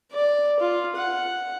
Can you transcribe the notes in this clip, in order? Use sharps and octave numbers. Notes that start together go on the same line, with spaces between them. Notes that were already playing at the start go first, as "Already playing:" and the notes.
D5
F4
F#5